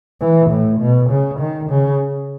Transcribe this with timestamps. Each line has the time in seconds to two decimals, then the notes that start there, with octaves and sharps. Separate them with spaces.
0.21 E3
0.50 A2
0.80 B2
1.10 C#3
1.40 D#3
1.70 C#3